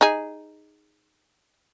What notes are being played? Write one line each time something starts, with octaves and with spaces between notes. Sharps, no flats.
D#4 G#4